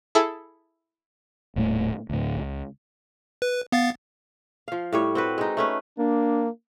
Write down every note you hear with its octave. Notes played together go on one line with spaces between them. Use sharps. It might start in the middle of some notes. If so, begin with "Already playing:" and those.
E4 G#4 A4
D#1 A2 A3
D2 A2
C#2
B4
B3 F5 A6
F3 F5
A2 G3 C#5
C4 F#4 B4
G#3 D#4
A3 C#4 B4
A#3 D4